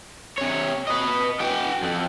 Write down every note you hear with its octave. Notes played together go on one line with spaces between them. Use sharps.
C3 C#5
B4 D#5
F#4 G5
F2